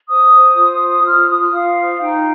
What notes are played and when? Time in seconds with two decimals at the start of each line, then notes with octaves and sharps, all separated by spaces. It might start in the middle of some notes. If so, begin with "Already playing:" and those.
0.09 C5 D#6
0.34 C5
0.57 F4
0.80 C5
1.04 F4 F6
1.28 F4 D#6
1.52 F4 F5
1.77 C5
2.00 D#4 G5